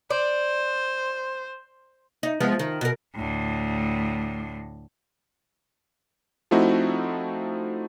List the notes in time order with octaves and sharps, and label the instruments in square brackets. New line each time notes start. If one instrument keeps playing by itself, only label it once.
[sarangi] C5 [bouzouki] D5
[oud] D#4
F3 G#3 B3
D#3
B2 A#4
[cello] D2 A2
[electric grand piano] F3 A3 C4 D#4 E4 F#4